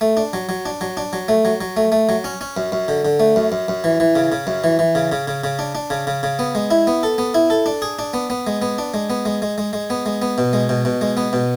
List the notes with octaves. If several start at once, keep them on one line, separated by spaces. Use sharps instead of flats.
A3
D4
F#3
F#3
D4
F#3
D4
F#3
A3
F#3
F#3
A3
A3
F#3
C#4
C#4
F#2
F#2
D3
D3
A3
F#2
F#2
F#2
E3
E3
C#3
C#3
F#2
E3
E3
C#3
C#3
C#3
C#3
D4
D4
C#3
C#3
C#3
B3
G#3
E4
B3
A4
B3
E4
A4
D4
G#4
D4
B3
B3
G#3
B3
D4
G#3
B3
G#3
G#3
G#3
G#3
B3
G#3
B3
B2
G#3
B2
B2
G#3
B3
B2